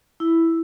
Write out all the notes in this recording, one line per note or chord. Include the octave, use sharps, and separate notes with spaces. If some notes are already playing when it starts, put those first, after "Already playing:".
E4